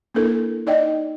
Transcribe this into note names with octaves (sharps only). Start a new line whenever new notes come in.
A#3 D4 E4 A4 A#4
D#4 D5 D#5 G5